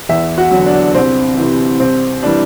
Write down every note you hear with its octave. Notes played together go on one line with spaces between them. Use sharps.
E2 E5
F#4
D3 F#3
D4
C2 C4
C3 E3
C2 C4
C3 E3 G3 D4